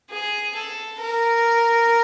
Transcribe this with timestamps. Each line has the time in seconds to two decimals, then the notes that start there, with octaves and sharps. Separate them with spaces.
0.10 G#4
0.55 A4
1.01 A#4